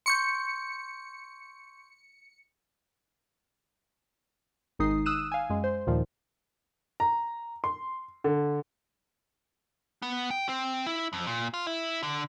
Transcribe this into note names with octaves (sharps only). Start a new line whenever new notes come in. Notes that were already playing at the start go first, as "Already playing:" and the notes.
C6 C#6 G6 C#7
G#1 D#3 G#3 D#4 D#6 C7
D#6 E6 F#6 D#7 E7
F5 G#5
F#2 G#3
C5
D#2 A#2 D#3 F3
A#5
C6
D3
B3
G5
C4
E4
F2
A#2
F4
E4
D3